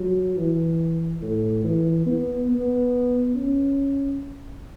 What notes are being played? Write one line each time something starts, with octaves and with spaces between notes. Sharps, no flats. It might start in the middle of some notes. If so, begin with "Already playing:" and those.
Already playing: F#3
E3
A2
E3
B3
B3
C#4